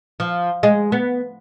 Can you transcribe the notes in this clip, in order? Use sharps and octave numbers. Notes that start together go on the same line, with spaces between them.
F3
G#3
B3